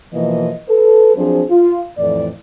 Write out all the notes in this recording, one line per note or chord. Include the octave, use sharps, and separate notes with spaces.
B2 E3 F3 A#3 D#5
A4 B4
F3 F#3 C4 D4 G#4 C5
F4
F2 A2 E3 D5